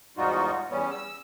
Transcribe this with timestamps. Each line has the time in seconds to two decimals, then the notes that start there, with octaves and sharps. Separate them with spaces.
0.17 E2 G#2 G3 D#4 F4 F#4
0.70 E2 G3 B3 C#4
0.91 E6